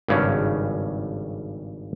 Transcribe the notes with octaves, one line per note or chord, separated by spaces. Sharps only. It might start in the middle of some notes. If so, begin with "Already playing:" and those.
G#1 G2 C#3 C#4